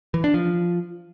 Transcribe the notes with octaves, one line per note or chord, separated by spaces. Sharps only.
E3
D4
F3